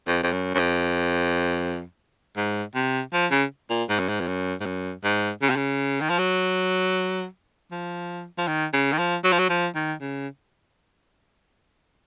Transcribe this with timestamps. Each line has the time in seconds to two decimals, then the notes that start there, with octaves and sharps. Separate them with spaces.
0.07 F2
0.23 F2
0.33 F#2
0.55 F#2
0.59 F2
2.37 G#2
2.75 C3
3.13 F3
3.32 C#3
3.70 A#2
3.89 G#2
3.99 F#2
4.09 G#2
4.20 F2
4.28 F#2
4.60 G#2
4.66 F#2
5.04 G#2
5.42 C#3
5.50 C3
5.57 C#3
6.01 D#3
6.10 F3
6.19 F#3
7.71 F3
8.38 F3
8.48 D#3
8.74 C#3
8.93 D#3
8.99 F3
9.24 F#3
9.32 F3
9.39 F#3
9.50 F3
9.76 D#3
10.01 C#3